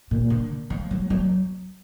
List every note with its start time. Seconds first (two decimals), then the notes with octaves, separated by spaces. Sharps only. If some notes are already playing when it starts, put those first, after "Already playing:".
0.11 A#2
0.30 D3
0.70 F3
0.91 F#3
1.10 F#3